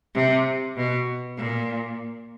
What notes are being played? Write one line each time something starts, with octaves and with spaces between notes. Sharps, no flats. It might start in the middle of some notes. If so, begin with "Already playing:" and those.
C3
B2
A#2